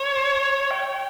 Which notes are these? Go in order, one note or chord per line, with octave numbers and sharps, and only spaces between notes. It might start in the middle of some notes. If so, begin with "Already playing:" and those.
Already playing: C#5
G5